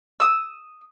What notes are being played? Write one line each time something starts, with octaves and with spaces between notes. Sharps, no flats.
D#6 E6